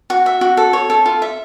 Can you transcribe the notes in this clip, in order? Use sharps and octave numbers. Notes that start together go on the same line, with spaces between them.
F#4
E5
F#4
A4
C#5
A4
F4
E5